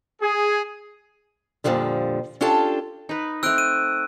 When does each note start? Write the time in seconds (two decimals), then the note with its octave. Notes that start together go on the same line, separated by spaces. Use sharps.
0.22 G#4
1.64 F2 A#2 D3 F3 G3
2.41 C#4 D4 F4 G4 A4 A5
3.09 D#4 B4
3.43 A3 C4 E6 F#6 D7
3.58 D#7